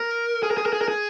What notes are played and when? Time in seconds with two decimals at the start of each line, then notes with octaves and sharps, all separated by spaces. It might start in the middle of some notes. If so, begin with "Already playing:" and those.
Already playing: A#4
0.43 G#4
0.51 A#4
0.57 G#4
0.66 A#4
0.73 G#4
0.81 A#4
0.88 G#4